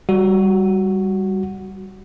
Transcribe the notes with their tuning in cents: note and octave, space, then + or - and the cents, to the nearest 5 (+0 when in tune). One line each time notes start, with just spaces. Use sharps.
G3 +0 F#4 +0